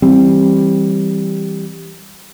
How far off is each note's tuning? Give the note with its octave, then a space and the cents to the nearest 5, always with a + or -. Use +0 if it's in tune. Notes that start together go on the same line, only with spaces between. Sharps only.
E3 -5 G3 +0 C4 +15